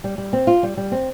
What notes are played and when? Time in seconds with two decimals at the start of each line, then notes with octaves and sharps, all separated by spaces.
0.04 G3
0.18 G3
0.33 C4
0.47 F4
0.63 G3
0.77 G3
0.92 C4